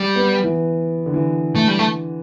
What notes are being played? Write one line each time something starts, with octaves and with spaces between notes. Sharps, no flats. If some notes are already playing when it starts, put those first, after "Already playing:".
Already playing: G3
B3
E3
D3
E3
A3
G3
A3